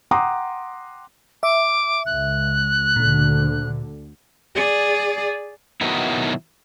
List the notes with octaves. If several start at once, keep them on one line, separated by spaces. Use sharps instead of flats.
F#5 G5 A#5 C6 D6 D#6
E5 D6
C#2 F#6
D2 A#2 D3
G#4 D5
B2 D#3 F#3 B3 D#4 E4